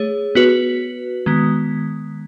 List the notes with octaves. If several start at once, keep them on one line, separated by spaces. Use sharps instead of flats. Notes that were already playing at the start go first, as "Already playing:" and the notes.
Already playing: A3 G#4 C#5
B3 F#4 B4
D#3 G#3 B3